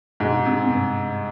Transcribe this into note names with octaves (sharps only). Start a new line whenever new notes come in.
G#2 B2
C3
G2